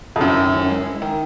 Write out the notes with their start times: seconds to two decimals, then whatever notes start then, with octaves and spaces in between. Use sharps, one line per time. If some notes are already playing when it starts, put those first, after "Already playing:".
0.16 F2
0.21 F#2 E4
0.37 D#3
0.53 C#4
0.70 G#3
0.86 E4
1.02 D#3